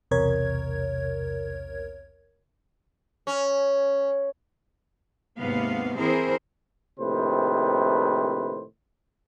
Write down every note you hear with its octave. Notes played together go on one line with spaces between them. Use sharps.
B1 E2 C3 A#4 C#5 G#6
C#4
D#2 G#2 C3 B3 F5
E3 C4 E4 G#4 A#4 C5
A#1 A2 C3 D#3 B4 C5